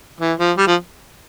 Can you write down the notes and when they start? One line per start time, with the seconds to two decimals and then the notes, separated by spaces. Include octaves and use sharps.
0.20 E3
0.39 F3
0.57 G3
0.67 F3